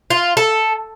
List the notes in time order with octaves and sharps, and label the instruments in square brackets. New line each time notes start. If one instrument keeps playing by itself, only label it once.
[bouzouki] F4
A4